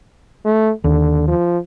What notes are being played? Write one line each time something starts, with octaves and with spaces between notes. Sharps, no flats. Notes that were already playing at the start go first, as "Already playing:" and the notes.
A3
D#2 D3
F3